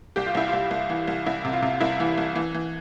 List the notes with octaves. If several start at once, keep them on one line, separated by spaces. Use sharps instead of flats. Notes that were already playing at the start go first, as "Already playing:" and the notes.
C2 G4
F4
C2 E4
F4
C2
C2
E3
C2
C2 E4
C3
F4
C3
C2 E4
E3
C2
E3
E3